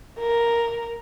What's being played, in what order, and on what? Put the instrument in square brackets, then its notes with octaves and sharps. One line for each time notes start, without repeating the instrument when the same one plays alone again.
[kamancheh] A#4